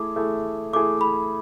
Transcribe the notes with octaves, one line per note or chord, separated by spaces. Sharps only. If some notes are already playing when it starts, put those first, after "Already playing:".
Already playing: A3 E4 G#4 D6
A3 E4 G#4
A3 E4 G#4 D6
B5